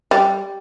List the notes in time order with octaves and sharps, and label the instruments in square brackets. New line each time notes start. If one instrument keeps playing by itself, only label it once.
[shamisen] G3